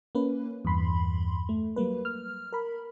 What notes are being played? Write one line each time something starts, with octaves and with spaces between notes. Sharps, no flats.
A#3 C#4 B4
E2 G2 B5 C6
A3
F#3 G3 A#3 B4
F6
A#4 B5